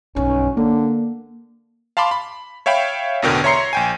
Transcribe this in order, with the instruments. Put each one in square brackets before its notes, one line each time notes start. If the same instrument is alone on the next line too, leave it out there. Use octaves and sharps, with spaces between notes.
[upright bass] B1 G2 [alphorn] C#4
[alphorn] D3 [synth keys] A#3 [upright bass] B3
[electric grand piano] F5 A5 B5 C6 D6
B5
C#5 E5 F5 G5 B5
A1 E2 B2 D3 A#4 G5
C#5 E5 A#5 C6 C7 C#7
A#1 G5 G#5